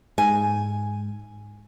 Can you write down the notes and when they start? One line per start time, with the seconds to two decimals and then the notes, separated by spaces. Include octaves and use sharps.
0.18 G#2 G#5